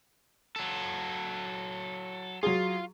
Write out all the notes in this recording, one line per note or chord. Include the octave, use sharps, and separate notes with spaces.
F#3 A4
F#3 F4 G#4